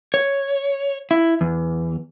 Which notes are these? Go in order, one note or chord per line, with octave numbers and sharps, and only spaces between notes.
C#5
E4
E2